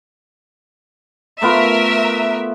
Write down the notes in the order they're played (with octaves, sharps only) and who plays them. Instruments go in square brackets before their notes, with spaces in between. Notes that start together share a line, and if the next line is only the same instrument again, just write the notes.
[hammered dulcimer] A3 B3 F4 [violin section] A#4 E5